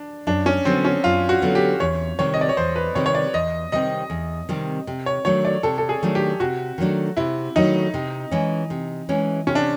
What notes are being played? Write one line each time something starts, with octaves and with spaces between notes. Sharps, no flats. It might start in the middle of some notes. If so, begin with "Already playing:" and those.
Already playing: D4
F#2 D4
C#4
D3 F#3 B3 C4
C#4
F#2 F4
F#4
D3 F#3 B3
G4
E2 C#5
C3 D#3 G3 C4 C#5
D#5
D5
C#5
E2 C5
B4
C3 D#3 G3 C4 C#5
C#5
D5
E2 D#5
C3 D#3 G3 C4 D#5
E2
C3 D#3 G3 C4
C3
C#5
D#3 F#3 A3 D4 C#5
D5
C3 A4
A4
G#4
D#3 F#3 A3 D4
G4
C3 F#4
D#3 F#3 A3 D4
C3 E4
D#3 F#3 A3 D4 D#4
C3
E3 G#3 C#4
C3
E3 G#3 C#4
C3 C#4
D4